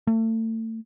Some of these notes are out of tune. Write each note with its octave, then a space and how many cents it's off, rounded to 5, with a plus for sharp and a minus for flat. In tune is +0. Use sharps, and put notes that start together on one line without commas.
A3 +35